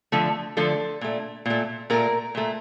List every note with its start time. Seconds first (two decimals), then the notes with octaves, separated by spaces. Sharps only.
0.12 D3 F3 A3
0.57 D3 F3 A3 A4
1.01 A#2 A3
1.46 A#2 A3
1.90 A#2 A3 A#4
2.35 A#2 A3